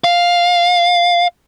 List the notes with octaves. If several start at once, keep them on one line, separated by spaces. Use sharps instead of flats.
F5